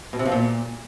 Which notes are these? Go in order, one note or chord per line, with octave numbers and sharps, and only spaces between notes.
B2
C3
F3
A#2